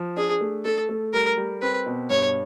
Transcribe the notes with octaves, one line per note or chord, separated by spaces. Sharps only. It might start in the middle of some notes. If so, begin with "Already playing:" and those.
Already playing: F3
D4 G#4
A3
A3 A4
A3
G3 A#4
G3
C4 B4
B2
G2 C#5